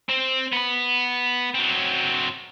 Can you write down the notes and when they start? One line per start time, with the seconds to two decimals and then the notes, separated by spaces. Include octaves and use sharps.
0.09 C4
0.53 B3 B5
1.54 F#3 C4